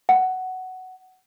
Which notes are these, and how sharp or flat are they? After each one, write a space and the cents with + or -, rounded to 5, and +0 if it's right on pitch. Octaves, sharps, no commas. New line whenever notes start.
F#5 +10